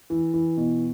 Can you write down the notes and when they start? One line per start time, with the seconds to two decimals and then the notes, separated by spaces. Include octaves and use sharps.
0.10 E3
0.34 E3
0.57 B2